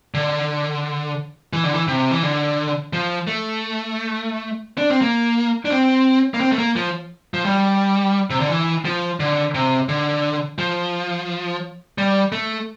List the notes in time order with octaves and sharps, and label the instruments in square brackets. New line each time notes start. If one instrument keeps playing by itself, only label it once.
[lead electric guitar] D3
E3
D3
E3
C3
E3
D3
F3
A3
D4
C4
A#3
D4
C4
A#3
C4
A3
A#3
F3
F3
G3
C3
D3
E3
F3
D3
C3
D3
F3
G3
A3